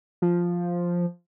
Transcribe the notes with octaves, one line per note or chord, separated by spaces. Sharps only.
F3